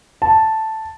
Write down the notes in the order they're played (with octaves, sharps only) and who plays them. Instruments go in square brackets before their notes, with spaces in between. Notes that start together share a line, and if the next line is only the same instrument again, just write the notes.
[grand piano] A5